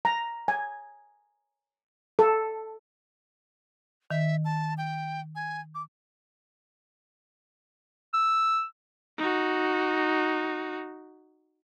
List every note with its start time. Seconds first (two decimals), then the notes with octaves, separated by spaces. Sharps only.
0.05 A#5
0.48 G#5
2.19 A4
4.11 D#3 E5
4.45 A5
4.78 G5
5.35 G#5
5.75 D6
8.14 E6
9.18 D#4 F#4